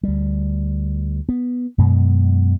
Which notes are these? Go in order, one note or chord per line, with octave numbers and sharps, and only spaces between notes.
D2 G3
B3
F#2 B2 G#3